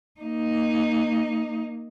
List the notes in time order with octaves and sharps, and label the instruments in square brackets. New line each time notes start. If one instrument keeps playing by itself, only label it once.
[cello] A#3 D#4